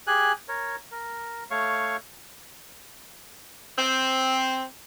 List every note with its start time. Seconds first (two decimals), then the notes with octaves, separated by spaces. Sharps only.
0.07 G4 G#4 G#5 F#6
0.49 A#4 C#5
0.91 A#4
1.51 A3 C#5 F5 C#6
3.77 C4